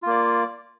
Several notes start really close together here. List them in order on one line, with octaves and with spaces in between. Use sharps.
F4 A#3 D5